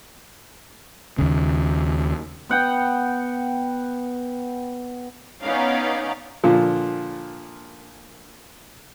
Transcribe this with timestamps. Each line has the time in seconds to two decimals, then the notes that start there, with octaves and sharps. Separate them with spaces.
1.18 D#2 C#3
2.49 B3 F#5 G5
5.42 B3 C#4 D#4 D5 F5 F#5
6.43 A#2 D3 F3